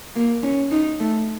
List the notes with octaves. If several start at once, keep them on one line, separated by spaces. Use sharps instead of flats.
A#3
C#4
D#4
A3